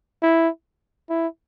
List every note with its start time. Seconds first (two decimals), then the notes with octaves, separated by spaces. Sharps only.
0.22 E4
1.10 E4